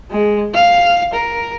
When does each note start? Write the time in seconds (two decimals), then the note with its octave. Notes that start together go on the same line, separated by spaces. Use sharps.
0.11 G#3
0.55 F5
1.13 A#4